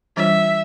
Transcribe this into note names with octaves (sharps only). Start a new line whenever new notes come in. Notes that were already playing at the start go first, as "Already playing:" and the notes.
E3 G3 D4 F4 C#5 E5